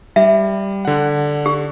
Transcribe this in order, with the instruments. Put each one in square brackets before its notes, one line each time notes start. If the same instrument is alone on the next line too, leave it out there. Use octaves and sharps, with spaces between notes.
[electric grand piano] G3 [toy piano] E5
[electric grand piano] D3 F#5
[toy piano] G4